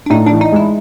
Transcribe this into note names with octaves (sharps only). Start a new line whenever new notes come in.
D4
A2 D#4
D4
E3
D#4
G#3 E4